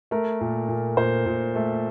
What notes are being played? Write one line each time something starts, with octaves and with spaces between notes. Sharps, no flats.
A3 A#4
A#2
A#2
A#2 C5
A#2
A3